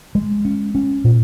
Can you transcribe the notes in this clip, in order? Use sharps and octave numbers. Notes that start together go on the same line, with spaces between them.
G#3
C#4
C#4
A#2